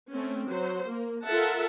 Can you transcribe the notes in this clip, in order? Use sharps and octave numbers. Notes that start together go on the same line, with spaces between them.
A3 C4 C#4
F#3 C5
A#3
F4 A4 A#4 E5 F#5 A5